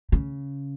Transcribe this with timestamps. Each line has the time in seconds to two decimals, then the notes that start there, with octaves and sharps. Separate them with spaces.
0.12 C#3